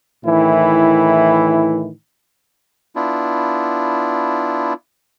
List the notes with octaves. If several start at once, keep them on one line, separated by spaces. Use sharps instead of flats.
A2 D#3 E3 E4
B3 D4 E4 F4